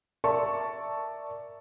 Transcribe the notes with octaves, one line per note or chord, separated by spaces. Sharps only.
A#4 D5 E5 A5 C#6